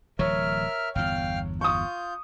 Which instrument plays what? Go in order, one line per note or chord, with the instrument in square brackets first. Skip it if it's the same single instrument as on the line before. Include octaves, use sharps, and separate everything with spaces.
[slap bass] D1 E3 F#3 [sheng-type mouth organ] A#4 E5 F6 [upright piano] C#5
[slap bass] G1 E2 [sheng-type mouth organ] F5 G5 F6
[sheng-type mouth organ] F4 G6 [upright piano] C#6 D#6